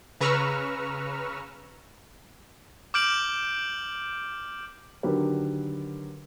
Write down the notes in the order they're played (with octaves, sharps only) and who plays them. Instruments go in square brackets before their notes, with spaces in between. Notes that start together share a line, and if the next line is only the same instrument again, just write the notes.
[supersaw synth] C#3 B4 A#5 C#6 E6 F6
[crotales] D6 F6 G6 D7 F#7
[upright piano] D3 D#3 F#3 G4 A#4 B4